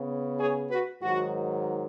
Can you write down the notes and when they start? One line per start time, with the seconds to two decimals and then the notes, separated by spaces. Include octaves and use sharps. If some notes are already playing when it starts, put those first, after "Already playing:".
Already playing: C#3 B3
0.38 G#4 C#5
0.69 F#4 B4
1.01 G#2 D#3 F#3 F#4